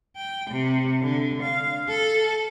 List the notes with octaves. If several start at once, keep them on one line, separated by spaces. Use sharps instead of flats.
G5
C3
D3
F5
A4